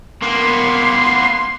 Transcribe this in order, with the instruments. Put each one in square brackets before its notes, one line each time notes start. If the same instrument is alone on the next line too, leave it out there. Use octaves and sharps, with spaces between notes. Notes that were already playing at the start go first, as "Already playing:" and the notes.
[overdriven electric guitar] A#3 B3 [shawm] C6